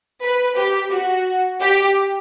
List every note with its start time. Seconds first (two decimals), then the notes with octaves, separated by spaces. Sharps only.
0.22 B4
0.56 G4
0.90 F#4
1.60 G4